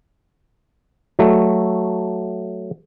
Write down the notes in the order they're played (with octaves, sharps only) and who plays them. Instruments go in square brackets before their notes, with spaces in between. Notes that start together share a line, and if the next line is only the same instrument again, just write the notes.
[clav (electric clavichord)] F#3 A3